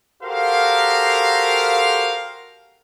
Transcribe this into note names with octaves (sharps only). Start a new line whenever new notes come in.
F#4 G4 A4 A#4 C5 F5